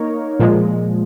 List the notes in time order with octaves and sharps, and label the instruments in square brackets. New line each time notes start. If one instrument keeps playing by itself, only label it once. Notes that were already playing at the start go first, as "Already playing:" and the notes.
Already playing: [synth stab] A#3 D#4 A#4 C#5
A#2 F3 G#3